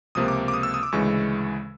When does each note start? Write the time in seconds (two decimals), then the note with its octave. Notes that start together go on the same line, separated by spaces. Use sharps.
0.15 C#2 C3 F3 A#3 D#6
0.28 D6
0.48 D6
0.54 D#6
0.63 E6
0.74 D#6
0.83 D6
0.92 D2 C#3 E3 G#3 C#6